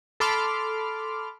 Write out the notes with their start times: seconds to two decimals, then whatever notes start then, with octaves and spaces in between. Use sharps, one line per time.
0.20 A4 B5 C6 D6 F6